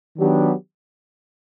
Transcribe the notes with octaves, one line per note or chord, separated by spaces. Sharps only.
D#3 F#3 B3 D4 G4